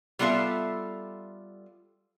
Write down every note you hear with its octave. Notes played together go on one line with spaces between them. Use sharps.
G3 B3 F4 A4 E5 F5